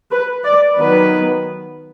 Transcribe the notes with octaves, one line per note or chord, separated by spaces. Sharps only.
B4
D5
D#3 F#3 B3 B4